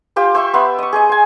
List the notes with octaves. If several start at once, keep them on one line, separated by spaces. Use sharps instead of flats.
F4 G4 C5 F5
C5 E5 C6 C#6
B3 E5 C6
D#5 C#6
G#4 C5 D#5
C5 G#5